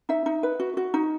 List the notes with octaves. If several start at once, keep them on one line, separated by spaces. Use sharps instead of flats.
D#4 E5
D#4
B4
F#4
F#4
D#4